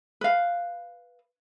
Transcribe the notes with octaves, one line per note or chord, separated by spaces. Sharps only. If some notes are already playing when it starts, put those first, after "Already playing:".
B4 F5